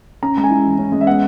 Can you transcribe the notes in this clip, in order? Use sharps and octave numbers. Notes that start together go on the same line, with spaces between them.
C#4 A#5
G#3 A#5
G#5
E4
E3
C#4
G#3
E5
B3 F#5